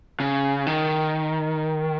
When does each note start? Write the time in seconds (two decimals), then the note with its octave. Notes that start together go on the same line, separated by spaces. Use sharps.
0.20 C#3
0.67 D#3